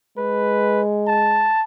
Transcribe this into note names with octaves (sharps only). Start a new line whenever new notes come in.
G#3 B4
A5